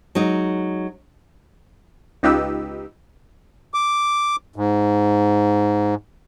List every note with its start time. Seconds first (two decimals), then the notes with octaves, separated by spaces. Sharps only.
0.15 F#3 G#3 D#4
2.23 C#2 D#4 F4 G4 B4 E6
3.74 D6
4.56 G#2